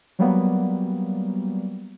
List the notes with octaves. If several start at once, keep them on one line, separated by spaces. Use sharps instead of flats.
F#3 G3 A#3 B3